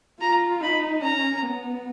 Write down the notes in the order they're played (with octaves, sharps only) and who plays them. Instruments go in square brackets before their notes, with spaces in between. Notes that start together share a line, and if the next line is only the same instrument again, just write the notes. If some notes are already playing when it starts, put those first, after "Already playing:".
[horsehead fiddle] F4 [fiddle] A#5
[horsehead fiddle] D#4 [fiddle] B5
[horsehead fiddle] C#4 [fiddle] A#5
[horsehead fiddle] B3